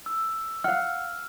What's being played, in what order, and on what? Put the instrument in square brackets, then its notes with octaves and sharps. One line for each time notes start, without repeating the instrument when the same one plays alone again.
[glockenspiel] E6
[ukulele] F5 F#5 [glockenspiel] F6